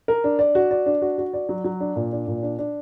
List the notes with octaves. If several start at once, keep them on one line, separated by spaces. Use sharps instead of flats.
A#4
D4
D5
F#4
D5
D4
F#4
F#4
D5
F#3
F#3
D4
A#2
D4
A#2
D4
D4